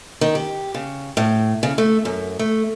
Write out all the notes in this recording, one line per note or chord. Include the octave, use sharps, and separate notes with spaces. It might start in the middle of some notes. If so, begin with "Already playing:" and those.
D#3
G4
C#3
A2
C#3
A3
F#2
A3